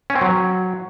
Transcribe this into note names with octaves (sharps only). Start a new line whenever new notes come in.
C#4
C4
F#3